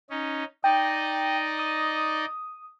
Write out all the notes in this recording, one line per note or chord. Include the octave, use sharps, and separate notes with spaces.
C#4 D#4
D#4 D5 D#5 G5
D#6